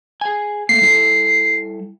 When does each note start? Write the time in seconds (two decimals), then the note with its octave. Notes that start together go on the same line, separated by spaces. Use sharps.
0.21 G#4 G#5
0.69 A3 A#3 C7
0.82 G3 E4 A4